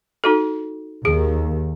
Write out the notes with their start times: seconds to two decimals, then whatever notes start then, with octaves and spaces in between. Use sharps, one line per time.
0.24 D#4 F#4 A4
1.05 D#2 G#4